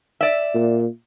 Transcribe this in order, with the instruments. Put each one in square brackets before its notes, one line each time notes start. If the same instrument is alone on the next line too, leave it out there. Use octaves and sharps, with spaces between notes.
[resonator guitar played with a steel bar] D5 E5
[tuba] A#2